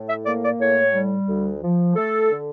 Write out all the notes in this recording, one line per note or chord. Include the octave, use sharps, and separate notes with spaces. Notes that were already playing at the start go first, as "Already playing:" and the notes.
Already playing: A2
E5
A#3 D5
D5
A2 C#5
G3
D2
F3
A3 A4
D3